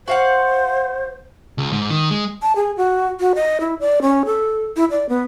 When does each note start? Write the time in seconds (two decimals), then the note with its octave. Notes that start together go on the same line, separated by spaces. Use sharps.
0.08 F#4 C5 F5 F#5
1.58 C#2
1.73 G#2
1.90 D#3
2.11 G#3
2.42 A5
2.56 G#4
2.77 F#4
3.20 F#4
3.35 D#5
3.60 E4
3.80 D5
4.02 C#4
4.26 A4
4.77 E4
4.90 D5
5.09 B3